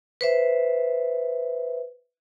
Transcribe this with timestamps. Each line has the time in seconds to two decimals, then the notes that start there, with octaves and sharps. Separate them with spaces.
0.21 B4 C5 E5